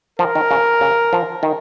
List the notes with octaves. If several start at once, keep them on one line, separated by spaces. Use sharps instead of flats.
F3 A#4
D#3
C#3
C#3
F3
D#3